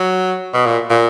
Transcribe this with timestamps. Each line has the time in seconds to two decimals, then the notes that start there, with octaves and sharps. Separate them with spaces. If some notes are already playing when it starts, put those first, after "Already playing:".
Already playing: F#3
0.54 B2
0.66 A#2
0.90 A#2